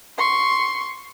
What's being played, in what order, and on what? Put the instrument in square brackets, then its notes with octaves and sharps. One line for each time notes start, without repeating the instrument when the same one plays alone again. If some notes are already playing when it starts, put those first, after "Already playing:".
[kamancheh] C6 C#6